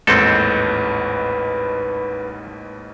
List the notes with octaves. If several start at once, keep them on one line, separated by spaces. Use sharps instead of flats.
A1 D#2 G#2 C4 A4 B4